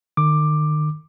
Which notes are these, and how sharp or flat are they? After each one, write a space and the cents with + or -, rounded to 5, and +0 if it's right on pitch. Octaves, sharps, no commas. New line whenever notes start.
D#3 -40 D6 +10